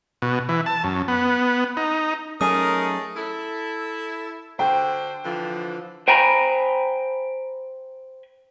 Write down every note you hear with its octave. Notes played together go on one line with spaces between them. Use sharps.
B2
E3
A5
F#2
B3
D#4
F#3 A3 C#4 D#4 G#4 A#4 D#6
E4 A4
D3 F#4 C5 G5
D3 E3 F3
C5 G5 G#5 A#5 B5